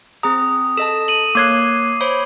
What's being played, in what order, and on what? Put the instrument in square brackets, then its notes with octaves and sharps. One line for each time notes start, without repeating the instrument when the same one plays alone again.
[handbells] C4 G#4 A#5 [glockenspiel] D#6
[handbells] A4 D#5 A5 [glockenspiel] E7
[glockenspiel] D#7 F#7
[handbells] A#3 C#5 F#6 [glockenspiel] D6 G#6 C7
[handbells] C5 C#5 B5